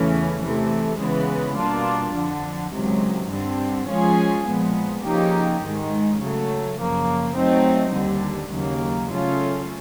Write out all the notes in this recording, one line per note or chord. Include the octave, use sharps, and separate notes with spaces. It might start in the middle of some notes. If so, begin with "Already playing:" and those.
Already playing: E2 C#3 E3 A3 C#4
C3 E3 A3
C#3 E3 G#3 B3
B2 G3 A#3 D4 F4
F2 D3 F3
C#2 C3 D#3 F#3
G2 D3 G3 C4
F3 G#3 C#4 F4 G#4
A#2 F3 G#3 B3
C#3 F3 A#3 D#4 G4
G#2 D#3 G#3
C#3 F#3 A3
F#2 C#3 F3 A#3
F#3 A3 C4 D#4
D#2 D3 G3
D#2 C#3 F#3 A#3
C#3 F#3 A3 C#4 F4